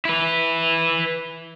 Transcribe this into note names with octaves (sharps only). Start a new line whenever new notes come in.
E4 B4